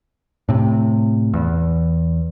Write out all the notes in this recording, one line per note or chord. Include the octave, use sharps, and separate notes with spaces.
A2 C3
E2